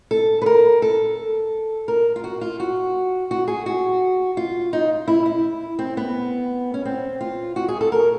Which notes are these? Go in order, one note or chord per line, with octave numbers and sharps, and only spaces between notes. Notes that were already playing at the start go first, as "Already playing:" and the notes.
A4
B4
A#4
A4
A#4
F4
F#4
F4
F#4
F#4
G#4
F#4
F4
D#4
E4
E4
C4
B3
C#4
C4
F4
F#4
G#4
A4
A#4